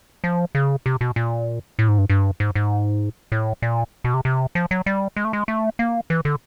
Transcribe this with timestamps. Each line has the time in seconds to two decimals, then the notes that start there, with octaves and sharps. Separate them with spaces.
0.24 F3
0.55 C#3
0.86 C3
1.01 B2
1.16 A#2
1.79 A2
1.88 G#2
1.98 G2
2.10 G2
2.40 G#2
2.55 G#2
3.32 A2
3.62 A#2
4.04 B2
4.14 C3
4.25 C3
4.55 F3
4.71 F#3
4.86 G3
5.17 G#3
5.25 A3
5.33 G#3
5.48 A3
5.79 A#3
6.10 E3
6.25 D3